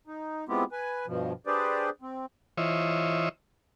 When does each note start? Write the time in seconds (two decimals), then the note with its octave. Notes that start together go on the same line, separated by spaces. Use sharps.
0.07 D#4
0.49 G#3 B3 C4 E4 F4 G4
0.72 B4 G#5
1.07 G2 B2 F3
1.47 D4 G4 G#4 B4 C5 D5
2.02 C4
2.58 E3 F4 C5 C#5 D#5 E5